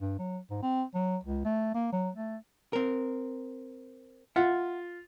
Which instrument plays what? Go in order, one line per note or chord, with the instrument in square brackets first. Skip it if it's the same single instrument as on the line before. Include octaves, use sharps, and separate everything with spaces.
[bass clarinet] G2
F#3
G#2
C4
F#3
C#2
A3
A#3
F#3
A3
[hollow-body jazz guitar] C4 A#4
[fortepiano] F4 [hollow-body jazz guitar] E5 F#5